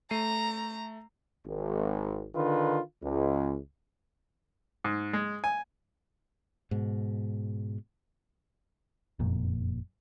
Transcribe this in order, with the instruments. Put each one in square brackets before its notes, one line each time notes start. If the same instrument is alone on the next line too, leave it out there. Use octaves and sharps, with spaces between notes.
[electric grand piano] A3 C7 D#7 [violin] A#5
[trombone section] G#1
D3 D#3 F4 B4
C#2
[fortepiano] G#2
G#3
G#5
[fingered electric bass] G#2 B2
[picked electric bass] F#1 F2 A#2